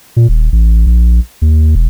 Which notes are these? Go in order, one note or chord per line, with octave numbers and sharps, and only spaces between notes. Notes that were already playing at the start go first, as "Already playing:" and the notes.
A#2
D#1
A1
A#1
D#2
E1